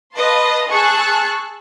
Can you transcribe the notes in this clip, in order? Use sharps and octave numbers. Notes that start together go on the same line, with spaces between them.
B4 D#5 F5 A5 C6
G#4 A5 C#6 E6 F#6